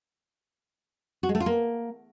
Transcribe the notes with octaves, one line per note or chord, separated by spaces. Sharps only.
F#4
G#3
A3
F4
A#3